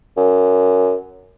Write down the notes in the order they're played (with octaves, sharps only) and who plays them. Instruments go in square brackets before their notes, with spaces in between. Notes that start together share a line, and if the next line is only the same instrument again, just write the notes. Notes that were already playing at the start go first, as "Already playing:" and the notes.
[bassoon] F#2